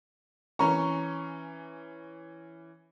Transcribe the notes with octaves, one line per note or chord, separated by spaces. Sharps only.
E3 C#4 A#5 C#6